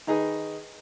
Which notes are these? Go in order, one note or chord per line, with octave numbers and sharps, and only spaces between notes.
D#3 D#4 G#4 B4